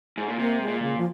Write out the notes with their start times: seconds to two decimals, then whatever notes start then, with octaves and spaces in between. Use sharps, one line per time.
0.18 G#2
0.28 A#2
0.39 C3 A#3
0.61 G#3
0.68 A#2
0.82 C#3
0.98 F3